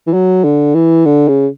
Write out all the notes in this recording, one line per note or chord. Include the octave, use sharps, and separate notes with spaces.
E3
F#3
D3
E3
D3
C#3